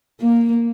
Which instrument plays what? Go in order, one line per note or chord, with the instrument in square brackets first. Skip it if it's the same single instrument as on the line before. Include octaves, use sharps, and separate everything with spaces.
[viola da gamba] A#3